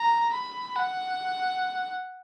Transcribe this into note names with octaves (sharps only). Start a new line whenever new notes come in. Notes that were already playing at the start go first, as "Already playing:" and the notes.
Already playing: A#5
B5
F#5